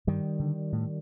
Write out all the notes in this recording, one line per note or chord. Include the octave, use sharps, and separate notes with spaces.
G2 D#3 G3
D3
A2